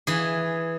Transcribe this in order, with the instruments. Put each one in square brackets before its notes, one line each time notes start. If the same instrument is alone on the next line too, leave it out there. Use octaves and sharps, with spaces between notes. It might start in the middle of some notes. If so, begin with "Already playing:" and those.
[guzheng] E3 G#4